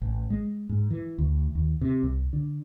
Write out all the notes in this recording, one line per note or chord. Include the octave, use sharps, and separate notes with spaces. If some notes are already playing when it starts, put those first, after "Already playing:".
A1
G#3
G#2
E3
D2
D#2
C3
C2
D3